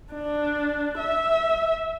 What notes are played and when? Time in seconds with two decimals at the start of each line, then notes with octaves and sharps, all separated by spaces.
0.13 D4
0.98 E5